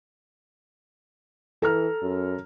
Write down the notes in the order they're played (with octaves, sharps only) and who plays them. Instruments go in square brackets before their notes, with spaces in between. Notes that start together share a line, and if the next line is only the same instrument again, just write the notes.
[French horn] E3 [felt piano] A4 A#5 F6
[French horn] F#2